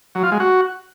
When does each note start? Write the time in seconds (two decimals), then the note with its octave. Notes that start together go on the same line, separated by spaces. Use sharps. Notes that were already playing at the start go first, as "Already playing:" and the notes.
0.15 F#3
0.23 F4
0.32 G#3
0.40 F#4